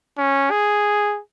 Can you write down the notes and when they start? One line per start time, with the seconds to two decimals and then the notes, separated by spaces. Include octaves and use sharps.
0.18 C#4
0.51 G#4